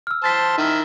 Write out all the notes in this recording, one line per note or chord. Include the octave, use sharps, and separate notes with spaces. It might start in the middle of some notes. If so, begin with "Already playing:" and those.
E6 F6
C5 A5 A6 B6
D#3 E4